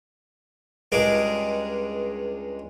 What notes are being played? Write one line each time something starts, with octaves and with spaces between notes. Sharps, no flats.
C#2 G2 G#3 G#4 A#4 D6